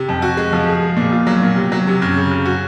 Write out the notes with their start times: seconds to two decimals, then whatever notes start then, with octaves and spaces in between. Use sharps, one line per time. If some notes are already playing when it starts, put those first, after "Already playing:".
Already playing: C3
0.09 F2
0.22 F#4
0.37 G#3
0.53 F3
0.68 G#4
0.82 G#3
0.97 A#2
1.12 F4
1.27 F#3
1.42 A#2
1.56 C3
1.72 F#3
1.87 C3
2.02 F#2
2.17 C#3
2.31 F#2
2.45 F#4